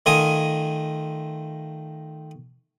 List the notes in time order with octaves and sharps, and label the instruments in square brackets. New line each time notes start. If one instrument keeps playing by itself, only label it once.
[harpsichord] D#3 A3 F4 A#4 G#5 D#6